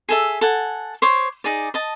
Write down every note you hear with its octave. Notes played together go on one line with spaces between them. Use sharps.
G#4 A4 E5
A4 F#5 G#5
C5 C#5 D6
D#4 G#4 D5
D#5 A5